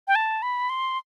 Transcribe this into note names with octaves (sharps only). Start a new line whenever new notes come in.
G5
A5
B5
C6